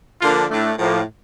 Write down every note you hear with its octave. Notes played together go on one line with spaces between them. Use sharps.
D3 F3 A#3 D4 F4
A2 A3 D4
A2 F3 A#3